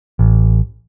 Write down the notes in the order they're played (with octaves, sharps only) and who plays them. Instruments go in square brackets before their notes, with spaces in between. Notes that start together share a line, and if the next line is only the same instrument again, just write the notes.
[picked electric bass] A1